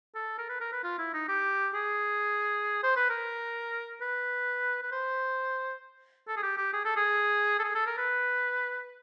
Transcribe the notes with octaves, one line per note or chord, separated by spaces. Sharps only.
A4
A#4
B4
A#4
B4
F4
E4
D#4
G4
G#4
C5
B4
A#4
B4
B4
C5
A4
G#4
G4
G4
G#4
A4
G#4
A4
G#4
A4
A#4
B4